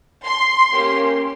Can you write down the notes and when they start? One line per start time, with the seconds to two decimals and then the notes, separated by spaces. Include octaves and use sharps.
0.25 C6
0.71 A#3 C#4 G4